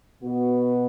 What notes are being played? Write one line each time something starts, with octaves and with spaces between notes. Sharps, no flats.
B2 B3 F#4